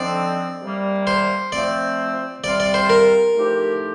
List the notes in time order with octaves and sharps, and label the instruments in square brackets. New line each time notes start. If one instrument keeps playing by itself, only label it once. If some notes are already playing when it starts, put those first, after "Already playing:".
Already playing: [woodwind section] D3 F3 C4 D#4 [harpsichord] D5
[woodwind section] C3 G3 A#3
[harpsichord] C5
[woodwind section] F3 A3 C4 [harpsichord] D5
[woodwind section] C3 G3 C4 F4 [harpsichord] D5
[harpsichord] D5
C5
A#4
[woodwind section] A2 F3 A3 D#4 G4